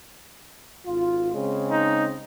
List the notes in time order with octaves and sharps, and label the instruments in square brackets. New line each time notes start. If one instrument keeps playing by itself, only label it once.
[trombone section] G#1 F4
C#3 G#3 C4
[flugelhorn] D#4